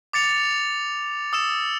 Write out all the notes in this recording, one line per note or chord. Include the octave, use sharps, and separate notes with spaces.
D6 A6 C#7 F7
D#6 E6 E7